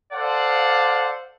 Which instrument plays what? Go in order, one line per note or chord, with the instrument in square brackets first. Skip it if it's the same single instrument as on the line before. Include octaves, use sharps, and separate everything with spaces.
[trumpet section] A4 C5 D5 F5 F#5